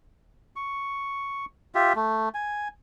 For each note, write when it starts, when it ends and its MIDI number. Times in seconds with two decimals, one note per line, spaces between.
0.56 1.46 85
1.75 1.93 65
1.75 1.93 67
1.75 1.93 76
1.96 2.29 57
2.34 2.68 80